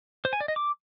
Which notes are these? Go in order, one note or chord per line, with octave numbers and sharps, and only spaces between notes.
C5
G#5
D5
D#5
D6